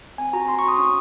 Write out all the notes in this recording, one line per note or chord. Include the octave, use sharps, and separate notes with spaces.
C4 G#5
F#4 A#5
C4 C6
C#6
F#4 D#6
C#4 C#6